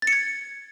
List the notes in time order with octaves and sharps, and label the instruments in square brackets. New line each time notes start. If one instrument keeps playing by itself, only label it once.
[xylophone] A6
C#7
G#6